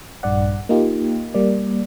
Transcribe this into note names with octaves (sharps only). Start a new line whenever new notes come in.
A#1 G2 D5 F#5
A#3 D#4 F4 G4
G3 A#3 D5